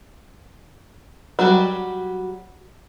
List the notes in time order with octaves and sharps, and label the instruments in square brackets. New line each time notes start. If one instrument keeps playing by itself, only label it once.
[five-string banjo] F#3 G3 F#4 G4